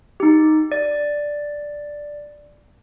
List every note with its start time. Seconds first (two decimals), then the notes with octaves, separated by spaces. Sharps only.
0.20 D#4 G4
0.72 D5